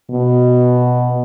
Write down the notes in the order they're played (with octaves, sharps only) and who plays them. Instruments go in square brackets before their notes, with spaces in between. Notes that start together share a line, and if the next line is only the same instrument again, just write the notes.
[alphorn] B2